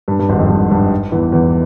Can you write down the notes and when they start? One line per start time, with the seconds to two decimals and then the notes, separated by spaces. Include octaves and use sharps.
0.08 G2
0.19 G2
0.29 G#1 G#2
0.39 F2
0.49 G2
0.71 G2
1.12 E2 E3
1.32 E2 E3